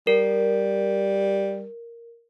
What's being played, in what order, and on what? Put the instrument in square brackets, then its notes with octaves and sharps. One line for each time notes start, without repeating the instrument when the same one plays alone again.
[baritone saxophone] G3 [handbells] A#4